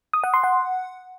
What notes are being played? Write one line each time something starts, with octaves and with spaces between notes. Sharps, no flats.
D#6
F#5
C6
F#5